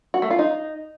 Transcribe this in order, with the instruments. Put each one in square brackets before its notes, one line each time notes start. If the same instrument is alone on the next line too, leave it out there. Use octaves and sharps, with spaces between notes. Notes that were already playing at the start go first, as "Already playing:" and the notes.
[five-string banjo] F#4
A3
F4
D#4